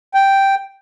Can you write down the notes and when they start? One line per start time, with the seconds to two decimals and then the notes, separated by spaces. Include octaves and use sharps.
0.14 G5